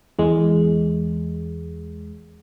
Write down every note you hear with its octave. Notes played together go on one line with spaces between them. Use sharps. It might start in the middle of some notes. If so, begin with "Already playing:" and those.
E2 G#3